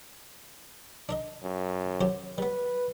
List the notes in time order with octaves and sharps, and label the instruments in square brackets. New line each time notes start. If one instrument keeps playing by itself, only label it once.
[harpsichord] D4 A#4 D#5
[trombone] F#2
[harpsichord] F#3 G4 C5
[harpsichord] G3 B3 [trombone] B4